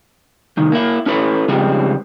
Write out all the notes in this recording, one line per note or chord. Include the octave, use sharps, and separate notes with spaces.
C2 D#3
A#3 E4
C#4 E4 A4 B4
C#3 F3 G3 G#3 C4